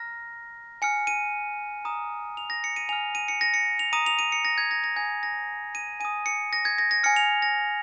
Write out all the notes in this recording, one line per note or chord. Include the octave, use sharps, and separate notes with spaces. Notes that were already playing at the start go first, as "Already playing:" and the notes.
Already playing: A#5 F6 A#6
G#5 F6 C#7
D#7
A#5 D#6
F7
A#6
C#7
D#7
G#5 F6 F7
D#7
C#7
A#6
C#7
F7
A#5 D#6 D#7
F7
D#7
C#7
A#6
G#6
A#6
A#6
G#5 D#6 G#6
A#6
D#7
G#5 D#6 D#7
C#7
A#6
G#6
A#6
A#6
G#5 F6 C#7
F7
A#6